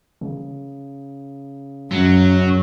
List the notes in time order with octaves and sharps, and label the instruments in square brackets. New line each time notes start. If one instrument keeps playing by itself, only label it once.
[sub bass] C#3
[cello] F#2 [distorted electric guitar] F#3